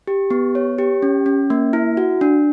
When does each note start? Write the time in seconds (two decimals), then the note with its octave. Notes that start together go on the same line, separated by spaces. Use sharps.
0.07 G4
0.31 B3
0.55 C#5
0.78 G4
1.02 C#4
1.26 C#4
1.50 A#3
1.73 E4
1.97 F#4
2.21 D4